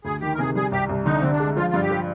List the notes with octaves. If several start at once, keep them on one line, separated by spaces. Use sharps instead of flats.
D2 G#4
D#3 G4
A#4
C3 G#4
G3 G#4
C2 G4
C2
D3 D#4
D3 C4
D4
G#3
F3 F4
G2 F4
G4
F3